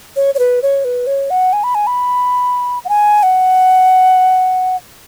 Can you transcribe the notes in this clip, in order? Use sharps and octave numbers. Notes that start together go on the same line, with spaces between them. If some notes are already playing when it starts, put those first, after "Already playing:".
C#5
C#5
B4
C#5
B4
C#5
F#5
G#5
B5
G#5
B5
F#5
G#5
F#5